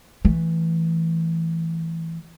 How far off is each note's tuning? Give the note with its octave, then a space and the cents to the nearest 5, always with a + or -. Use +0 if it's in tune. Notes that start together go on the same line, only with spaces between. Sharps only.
E3 +0 A3 -5